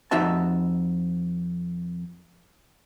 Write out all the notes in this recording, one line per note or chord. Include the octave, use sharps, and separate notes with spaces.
F2 D#4 F#4 E5 A5